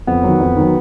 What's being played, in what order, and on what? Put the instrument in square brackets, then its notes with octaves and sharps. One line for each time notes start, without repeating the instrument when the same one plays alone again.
[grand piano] F2 [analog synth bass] B3
[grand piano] D#3 F#3
F2
D#3 F#3